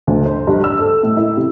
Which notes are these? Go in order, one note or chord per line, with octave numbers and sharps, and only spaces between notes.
D2
C5
G2
E6
A4
A2
E4
C3